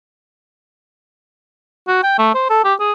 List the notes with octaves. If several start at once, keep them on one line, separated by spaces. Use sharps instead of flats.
F#4
G5
A3
C5
A4
G4
G#4